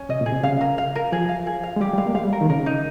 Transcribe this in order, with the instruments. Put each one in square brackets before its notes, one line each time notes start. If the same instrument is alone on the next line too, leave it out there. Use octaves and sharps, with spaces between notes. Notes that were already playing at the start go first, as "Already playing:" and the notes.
Already playing: [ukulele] C#4
[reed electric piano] C3 [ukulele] D#5
[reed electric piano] A#2
[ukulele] G#4
[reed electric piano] C3
[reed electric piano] C#3 [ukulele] F5
[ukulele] A#4
F5
A#4
[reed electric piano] F3 [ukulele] G#4
[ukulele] F5
G#4
F5
[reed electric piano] G#3
[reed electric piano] G3 [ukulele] G4
[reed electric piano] G3
[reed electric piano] G#3 [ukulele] F5
[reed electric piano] A#3
[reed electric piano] G#3 [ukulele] F5
[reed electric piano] G3
[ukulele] A#4
[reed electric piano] D#3
[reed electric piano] C#3 [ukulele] A#4
[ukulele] D#4